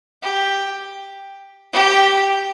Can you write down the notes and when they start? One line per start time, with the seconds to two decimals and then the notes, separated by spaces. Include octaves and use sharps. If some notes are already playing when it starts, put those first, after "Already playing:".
0.23 G4
1.73 G4